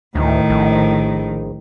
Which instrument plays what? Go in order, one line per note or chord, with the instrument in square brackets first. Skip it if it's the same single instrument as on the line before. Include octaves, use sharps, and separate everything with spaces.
[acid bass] D2 [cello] A2 D#3
[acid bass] A#1